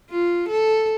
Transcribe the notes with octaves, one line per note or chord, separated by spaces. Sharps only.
F4
A4